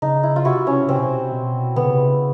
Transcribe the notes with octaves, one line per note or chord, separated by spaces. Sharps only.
C#3 D#4
E4
F4
C3 E4 F#4
C#4
C3 C4
B2
C3
B2
D3 B3
C#3
C3
C#3